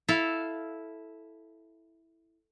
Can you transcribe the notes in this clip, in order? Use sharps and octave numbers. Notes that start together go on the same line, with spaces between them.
E4 A4 F5